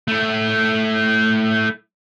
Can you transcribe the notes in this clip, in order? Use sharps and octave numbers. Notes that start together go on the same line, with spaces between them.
A3 E4